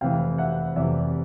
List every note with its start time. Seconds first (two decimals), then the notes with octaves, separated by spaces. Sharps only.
0.01 F1 F2 C3 E3 F5 G5
0.38 E5 F#5
0.76 F1 F2 C3 E3 D5 E5